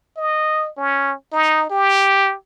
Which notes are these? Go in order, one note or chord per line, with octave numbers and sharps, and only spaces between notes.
D#5
C#4
D#4
G4